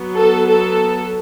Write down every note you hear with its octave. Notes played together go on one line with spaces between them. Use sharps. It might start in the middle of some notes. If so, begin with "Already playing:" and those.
Already playing: F#3 B3
A4
A4